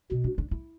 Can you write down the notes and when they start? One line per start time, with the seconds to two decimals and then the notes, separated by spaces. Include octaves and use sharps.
0.11 B2 C4
0.24 D4
0.38 D4
0.51 E4